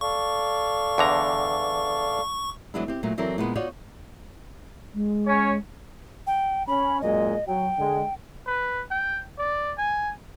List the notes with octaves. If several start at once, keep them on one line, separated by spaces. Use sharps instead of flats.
A4 D5 F5 C#6
E2 D3 A#5
E3 F#3 G#3 B3 D4 E4
C4 G4
A#2 F#3 A3
E3 F#3 C4 A4 A#4 D5
A#2 G#3 B3
D#4 F4 F#4 C#5 D5
G#3
C#4 C#5
G5
C#4 B5
F#2 A#2 G#3 D#5
F#3 G5
D3 G#3
B4
G5
D5
G#5